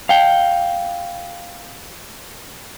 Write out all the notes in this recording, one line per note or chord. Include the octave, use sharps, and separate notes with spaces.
F5 G5